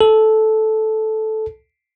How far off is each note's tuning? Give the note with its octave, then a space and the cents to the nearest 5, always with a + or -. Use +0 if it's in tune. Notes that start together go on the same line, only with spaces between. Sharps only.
A4 -10